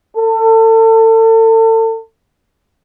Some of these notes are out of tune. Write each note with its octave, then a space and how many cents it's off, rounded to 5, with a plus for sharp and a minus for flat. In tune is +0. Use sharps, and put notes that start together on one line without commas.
A4 +35